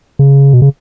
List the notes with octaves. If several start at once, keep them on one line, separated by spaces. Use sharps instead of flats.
C#3
B2
C#3